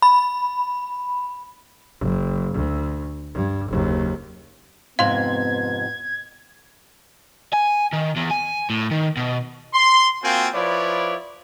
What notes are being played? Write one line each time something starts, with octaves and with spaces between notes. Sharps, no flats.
B5
F#1
D2
G2
F#1 D#2
F2 G#2 C3 B3 F5 C6 G#6 F7
G#5
D#3
E2
G#5
A2
D#3
B2
C6
A#3 C4 F4 F#4 G5 G#5
F3 E4 B4 C#5 D5